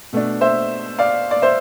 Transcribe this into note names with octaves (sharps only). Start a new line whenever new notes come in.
B2 A3 D4
C5 E5
D5 F5
D5
C5 E5